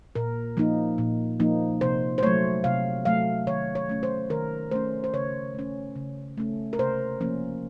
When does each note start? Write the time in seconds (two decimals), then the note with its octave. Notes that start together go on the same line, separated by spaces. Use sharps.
0.15 A#2 A#4
0.57 F3 A#3 D#4
0.98 A#2
1.40 F3 A#3 D#4
1.81 C3 C5
2.18 C5
2.23 F#3 A3 C#5
2.64 C3 F5
3.05 F#3 A3 F5
3.47 D#3 C#5
3.75 C#5
3.89 A3 C#4
4.03 C5
4.30 D#3 A#4
4.71 A3 C#4 C5
5.04 C5
5.13 C#3 C#5
5.55 A3 C#4
5.96 C#3
6.38 A3 C#4
6.73 A#4
6.79 C3 C5
7.21 F3 A#3 C#4